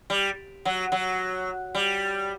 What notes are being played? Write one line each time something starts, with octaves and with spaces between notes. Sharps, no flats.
G3
F#3
F#3
G3